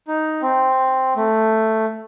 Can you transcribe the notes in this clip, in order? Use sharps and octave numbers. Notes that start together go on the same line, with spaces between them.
D#4
C4
A3